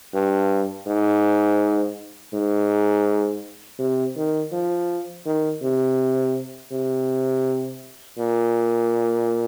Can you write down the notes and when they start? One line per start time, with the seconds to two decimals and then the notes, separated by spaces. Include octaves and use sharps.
0.14 G2
0.87 G#2
2.34 G#2
3.79 C3
4.16 D#3
4.52 F3
5.26 D#3
5.62 C3
6.72 C3
8.18 A#2